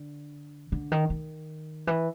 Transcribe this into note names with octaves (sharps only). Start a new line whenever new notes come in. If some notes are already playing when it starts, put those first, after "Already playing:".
Already playing: D3
D3
D#3
D#3
E3